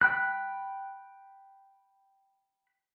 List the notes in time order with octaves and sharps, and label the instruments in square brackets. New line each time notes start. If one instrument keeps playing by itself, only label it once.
[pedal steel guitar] G5 B5 F#6